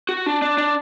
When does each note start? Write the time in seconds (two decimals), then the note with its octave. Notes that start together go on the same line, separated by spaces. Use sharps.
0.09 F#4
0.26 D4
0.42 D4
0.58 D4